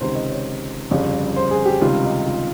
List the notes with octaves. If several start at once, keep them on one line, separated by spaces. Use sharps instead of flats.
C#2 C3 D#3 C5
D#5
C#5
G1 F2 C#3 G3
C5
G#4
G4
C#2 C3 D#3 G3 F4
D#4
F4